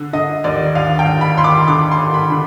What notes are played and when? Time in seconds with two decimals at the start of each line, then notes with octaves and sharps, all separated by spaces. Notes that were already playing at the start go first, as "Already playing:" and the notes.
Already playing: D3
0.13 D3 D#5
0.44 D#2 D5
0.75 D#2 F5
0.99 G5
1.06 D#2
1.21 B5
1.37 D#2 C6
1.44 D6
1.68 D3 D6
1.92 C6
1.98 D#2
2.14 B5
2.30 D3